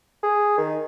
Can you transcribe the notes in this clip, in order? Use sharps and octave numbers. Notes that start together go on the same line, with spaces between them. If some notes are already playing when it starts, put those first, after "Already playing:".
G#4
D#3